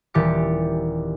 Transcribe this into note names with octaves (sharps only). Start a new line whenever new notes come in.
D#1 E3 G4 D6 A6 C#7